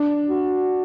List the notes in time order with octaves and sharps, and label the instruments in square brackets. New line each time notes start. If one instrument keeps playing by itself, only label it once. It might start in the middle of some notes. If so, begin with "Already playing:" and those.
Already playing: [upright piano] D4
[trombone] F#4